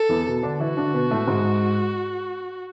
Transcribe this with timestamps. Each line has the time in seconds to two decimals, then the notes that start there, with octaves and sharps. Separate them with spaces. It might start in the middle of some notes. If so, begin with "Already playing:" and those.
Already playing: A4
0.09 E2 E3
0.27 B2 B3
0.43 D3 D4
0.60 E3 E4 F#4
0.77 D3 D4
0.94 B2 B3
1.11 A2 A3
1.27 G#2 G#3